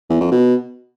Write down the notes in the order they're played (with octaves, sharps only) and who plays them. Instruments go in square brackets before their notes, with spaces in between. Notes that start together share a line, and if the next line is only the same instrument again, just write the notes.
[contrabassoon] E2
F2
B2